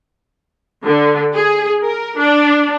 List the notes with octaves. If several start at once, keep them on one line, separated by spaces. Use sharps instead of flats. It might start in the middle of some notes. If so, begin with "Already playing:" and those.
D3
G#4
A#4
D4